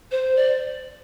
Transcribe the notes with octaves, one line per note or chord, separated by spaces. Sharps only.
C5
D5